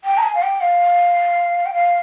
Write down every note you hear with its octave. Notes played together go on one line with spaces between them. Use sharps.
G5
A#5
G#5
F5
G5
F5
G5
F5